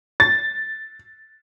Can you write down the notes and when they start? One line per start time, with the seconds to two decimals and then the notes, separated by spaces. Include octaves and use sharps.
0.20 A6